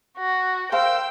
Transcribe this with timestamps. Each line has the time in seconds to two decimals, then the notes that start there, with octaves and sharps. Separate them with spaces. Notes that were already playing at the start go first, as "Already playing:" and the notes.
0.18 F#4
0.72 A#4 C5 F5 G5 E6